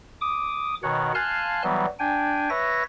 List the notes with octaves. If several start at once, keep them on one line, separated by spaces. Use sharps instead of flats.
D6 D#6
B2 D#3 C#5 F#5
F5 G#5 A5 C6 F6 F#6
E3 F#3 G3 B3
D4 G5 G#5
B4 C#5 E5 A#6